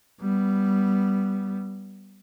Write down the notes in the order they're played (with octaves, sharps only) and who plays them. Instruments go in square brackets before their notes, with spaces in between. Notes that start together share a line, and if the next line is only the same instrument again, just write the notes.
[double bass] G3 B3